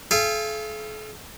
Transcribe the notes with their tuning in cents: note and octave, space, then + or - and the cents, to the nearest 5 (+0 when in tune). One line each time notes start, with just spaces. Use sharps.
A4 -45 F5 -40 G#5 -45